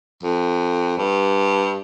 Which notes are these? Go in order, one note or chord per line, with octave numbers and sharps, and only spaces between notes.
F2
G2